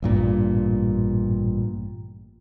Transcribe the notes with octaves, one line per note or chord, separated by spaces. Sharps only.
A1 G2 A#2